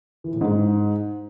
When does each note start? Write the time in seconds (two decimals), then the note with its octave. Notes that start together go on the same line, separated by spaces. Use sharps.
0.24 E3
0.33 A2
0.41 G#2